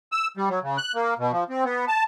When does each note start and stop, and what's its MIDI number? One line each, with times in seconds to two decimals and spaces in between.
0.12 0.27 88
0.37 0.49 55
0.49 0.60 54
0.63 0.77 49
0.78 0.93 90
0.95 1.14 58
1.19 1.32 47
1.32 1.44 53
1.49 1.64 60
1.65 1.85 59
1.88 2.04 81